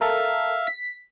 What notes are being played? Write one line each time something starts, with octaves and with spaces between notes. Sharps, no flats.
A4 A#4 E5 F5
B6